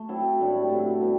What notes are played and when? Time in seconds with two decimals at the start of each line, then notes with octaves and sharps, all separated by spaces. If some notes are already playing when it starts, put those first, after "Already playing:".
Already playing: A3
0.08 F#3 C4 E4 A4
0.40 A2 G3 D4 G4
0.69 C3 F#3 A3
1.01 G3 B3